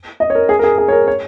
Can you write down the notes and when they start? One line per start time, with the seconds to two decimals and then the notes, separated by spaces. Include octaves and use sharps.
0.20 D#5
0.30 C#5
0.35 A#4
0.49 G#4
0.59 A#4
0.64 G#4
0.78 G#4
0.88 C#5
0.92 A#4
1.08 C#5